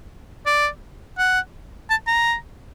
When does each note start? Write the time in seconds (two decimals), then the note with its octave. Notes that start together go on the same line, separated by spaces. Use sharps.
0.46 D5
1.18 F#5
1.90 A5
2.07 A#5